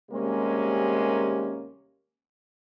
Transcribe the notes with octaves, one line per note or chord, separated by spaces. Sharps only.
D#2 C3 G3 G#3 A#3 C#4